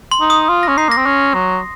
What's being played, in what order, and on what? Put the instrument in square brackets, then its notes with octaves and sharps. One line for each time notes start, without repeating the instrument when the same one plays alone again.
[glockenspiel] C6
[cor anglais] D#4
[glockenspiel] D#6
[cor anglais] F4
[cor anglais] C#4 [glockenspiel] A#6
[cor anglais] D#4 [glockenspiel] C7
[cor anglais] A#3 [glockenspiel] A#6
[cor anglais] C4
C#4
F#3